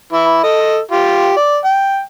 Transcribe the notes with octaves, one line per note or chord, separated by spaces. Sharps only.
E3 E4
A4 D#5
F4 G4
D5
G5